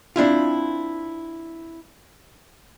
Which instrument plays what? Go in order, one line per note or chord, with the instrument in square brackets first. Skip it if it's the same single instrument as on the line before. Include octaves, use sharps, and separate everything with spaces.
[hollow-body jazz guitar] C4 D4 E4 F4